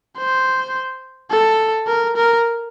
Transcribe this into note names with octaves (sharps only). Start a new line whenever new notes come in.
C5
A4
A#4
A#4